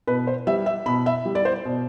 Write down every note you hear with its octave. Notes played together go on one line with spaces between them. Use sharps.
B2 B4
C5
G3 E5
E5
B2 B5
E5
G3
D5
C5
B2